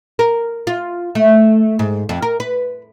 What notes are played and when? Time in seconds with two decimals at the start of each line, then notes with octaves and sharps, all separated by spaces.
0.19 A#4
0.67 F4
1.15 A3
1.79 G#2
2.09 F2
2.22 A#4
2.40 B4